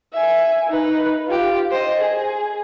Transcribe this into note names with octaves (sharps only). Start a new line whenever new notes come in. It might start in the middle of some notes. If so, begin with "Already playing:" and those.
E5 G#5
D#4 B4
F4 G4
C5 D#5
G#4